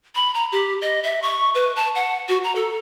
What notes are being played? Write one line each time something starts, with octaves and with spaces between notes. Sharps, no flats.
B5
A#5
G4
D#5
E5
C#6
B4
A5
F#5
F#4
A#5
A4